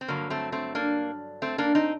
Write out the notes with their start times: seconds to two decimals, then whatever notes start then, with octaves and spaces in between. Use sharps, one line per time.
0.01 C4
0.08 G2 D3 F#3 A#3
0.30 A3 C4
0.52 A3 C4
0.75 A#3 D4
1.42 A3 C4
1.58 A#3 D4
1.75 C4 D#4